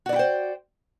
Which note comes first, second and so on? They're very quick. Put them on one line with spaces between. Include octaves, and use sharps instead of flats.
F#4 D5 E4 G5 C5